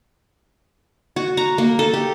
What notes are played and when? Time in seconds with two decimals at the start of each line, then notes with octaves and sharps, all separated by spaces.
1.16 F#4
1.37 A#5
1.58 A#3
1.79 A4
1.94 G4